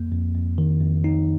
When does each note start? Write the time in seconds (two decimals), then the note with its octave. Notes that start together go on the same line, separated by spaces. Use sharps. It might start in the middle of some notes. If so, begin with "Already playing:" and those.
Already playing: F2 A#3
0.12 F2
0.34 F2
0.58 D#3
0.81 F2
1.04 D#4